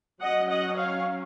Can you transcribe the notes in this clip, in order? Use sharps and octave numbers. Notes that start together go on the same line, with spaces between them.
F#3 C#4 D#5 F#5
D#5 F#5
C#5 F5